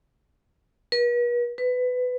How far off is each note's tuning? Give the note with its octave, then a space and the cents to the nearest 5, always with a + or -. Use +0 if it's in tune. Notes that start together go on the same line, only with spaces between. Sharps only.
B4 -45
B4 +20